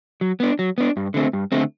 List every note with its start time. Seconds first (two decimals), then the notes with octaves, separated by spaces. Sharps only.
0.21 F#3
0.40 B3 D4
0.59 F#3
0.78 B3 D4
0.97 G2
1.14 D3 A3 C4
1.33 G2
1.52 D3 A3 C4